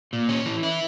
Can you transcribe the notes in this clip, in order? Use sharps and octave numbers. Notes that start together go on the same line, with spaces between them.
A#2
C#4
E3
E4